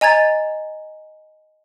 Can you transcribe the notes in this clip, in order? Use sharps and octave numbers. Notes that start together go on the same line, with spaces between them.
D#5 G#5 A#5 G#6 A6